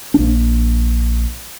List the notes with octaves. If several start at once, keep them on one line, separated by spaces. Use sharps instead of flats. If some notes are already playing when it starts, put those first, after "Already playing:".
A#1 D4